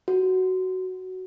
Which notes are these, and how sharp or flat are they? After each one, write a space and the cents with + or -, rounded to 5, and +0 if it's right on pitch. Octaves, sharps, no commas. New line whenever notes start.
F#4 +10